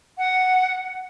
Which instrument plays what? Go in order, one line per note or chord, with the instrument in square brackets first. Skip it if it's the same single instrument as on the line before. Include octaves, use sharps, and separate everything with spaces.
[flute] F#5